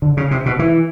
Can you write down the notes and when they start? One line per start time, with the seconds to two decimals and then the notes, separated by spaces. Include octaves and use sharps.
0.02 D3
0.17 C#3
0.31 C3
0.46 B2
0.59 E3